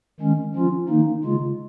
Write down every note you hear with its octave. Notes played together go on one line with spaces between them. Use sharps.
D#3 G#3 C#4
F3 C#4 F4
D#3 A#3 D#4
C#3 G#3 F4